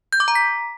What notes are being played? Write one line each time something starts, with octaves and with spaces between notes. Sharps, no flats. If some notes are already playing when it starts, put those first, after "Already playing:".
G6
D6
A#5
B6